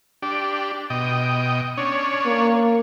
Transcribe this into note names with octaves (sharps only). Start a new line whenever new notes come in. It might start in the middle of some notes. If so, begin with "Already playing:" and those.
D4 G4
B2 D#5 G5
C#4 D4 C#5
A#3